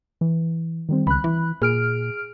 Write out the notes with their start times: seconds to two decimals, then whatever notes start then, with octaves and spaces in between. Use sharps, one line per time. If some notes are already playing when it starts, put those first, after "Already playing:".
0.21 E3
0.89 D#3 G3 C4
1.07 C#2 B5 F#6
1.24 E3
1.62 A#2 G#4 F6 D7